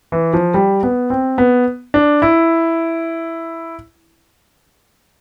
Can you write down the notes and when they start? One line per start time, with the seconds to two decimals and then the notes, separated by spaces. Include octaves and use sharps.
0.12 E3
0.33 F3
0.54 G3
0.83 B3
1.10 C4
1.38 B3
1.94 D4
2.22 E4